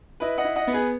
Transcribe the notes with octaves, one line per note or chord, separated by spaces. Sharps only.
E4 B4 D#5
D#5 F#5
E4
D#5 F#5
B3
G#4 B4